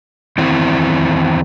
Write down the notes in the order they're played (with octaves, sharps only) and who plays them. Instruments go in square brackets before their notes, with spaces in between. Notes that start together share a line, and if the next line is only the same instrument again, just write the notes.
[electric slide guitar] E2 D#3 C4 E4 C5